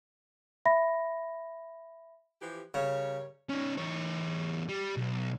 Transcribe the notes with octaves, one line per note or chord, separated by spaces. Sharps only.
E5 B5 A#6
E3 F3 G4
C#3 G3 A#4 C#5
C#4 D#4
E2 C#5
G3
B1